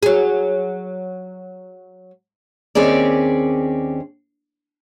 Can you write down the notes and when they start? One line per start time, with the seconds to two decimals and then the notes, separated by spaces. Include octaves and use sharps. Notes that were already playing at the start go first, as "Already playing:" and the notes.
0.03 F#3 G#4
2.75 D#2 C4 C#4 G4 G#4 D5